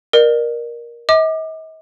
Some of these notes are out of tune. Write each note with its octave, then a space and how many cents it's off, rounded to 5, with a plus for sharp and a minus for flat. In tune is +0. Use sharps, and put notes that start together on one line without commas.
A#4 +15 D5 +45
D#5 +40 D6 +30